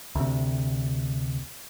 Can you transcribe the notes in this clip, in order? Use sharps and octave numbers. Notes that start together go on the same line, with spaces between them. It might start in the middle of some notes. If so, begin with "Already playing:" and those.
D2 C3